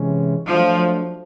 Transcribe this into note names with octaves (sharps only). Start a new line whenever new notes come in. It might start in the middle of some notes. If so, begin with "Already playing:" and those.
Already playing: C3 E3 G#3 C#4
F3 F#3 A3 D4